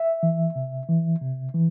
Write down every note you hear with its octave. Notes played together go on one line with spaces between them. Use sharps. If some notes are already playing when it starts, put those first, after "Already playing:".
Already playing: E5
E3
C3
E3
C3
E3